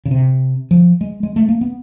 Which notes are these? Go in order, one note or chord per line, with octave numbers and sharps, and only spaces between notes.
C#3
C3
F3
G#3
G#3
A3
A#3
B3